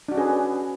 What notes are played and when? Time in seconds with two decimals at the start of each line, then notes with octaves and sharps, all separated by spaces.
0.08 D4
0.12 F#4
0.15 C#4
0.18 G#4
0.21 B4